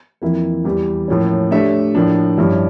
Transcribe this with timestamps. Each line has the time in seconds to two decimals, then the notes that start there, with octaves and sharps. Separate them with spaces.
0.22 F2 E3 A#3 E4
0.65 E2 E3 G3
1.08 A2 F3 A#3 C#4
1.51 A3 D4 G4 C#5 E5
1.95 A2 F3 A#3 D4
2.38 G2 F3 C#4 E4